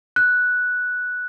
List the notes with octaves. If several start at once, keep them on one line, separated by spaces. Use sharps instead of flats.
F#6